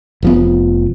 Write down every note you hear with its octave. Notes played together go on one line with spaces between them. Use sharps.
F1 F3 B3